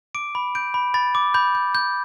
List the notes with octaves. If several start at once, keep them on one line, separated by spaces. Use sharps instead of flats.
D6 D7
B5
G6 D7
B5
B5 A6
D6
B5 G6
G6
G6